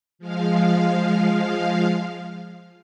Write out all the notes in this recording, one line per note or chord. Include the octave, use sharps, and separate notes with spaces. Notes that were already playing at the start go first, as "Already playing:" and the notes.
F3 G#3 F5